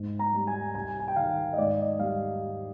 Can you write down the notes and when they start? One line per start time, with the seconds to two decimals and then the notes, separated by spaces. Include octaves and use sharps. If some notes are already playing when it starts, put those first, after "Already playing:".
Already playing: G#2
0.19 A#5
0.33 G3
0.47 G#5
0.75 C2 G#5
0.99 G#5
1.08 G5
1.16 D#3 F5
1.53 D#5
1.58 G#2 D5
1.79 D#5
1.99 G3 F5